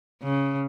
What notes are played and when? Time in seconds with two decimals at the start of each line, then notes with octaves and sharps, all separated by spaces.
0.23 C#3